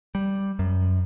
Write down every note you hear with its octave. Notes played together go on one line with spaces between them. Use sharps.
G3
F#2